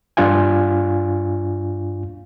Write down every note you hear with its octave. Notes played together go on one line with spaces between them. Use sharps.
G2 D4 F4 F5 G#5